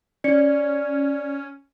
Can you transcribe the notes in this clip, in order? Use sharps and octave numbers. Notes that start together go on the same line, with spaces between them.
C#4 D5 C#7